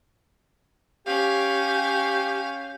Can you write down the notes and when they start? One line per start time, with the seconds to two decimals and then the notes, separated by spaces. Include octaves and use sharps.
1.07 C#4 G4 F5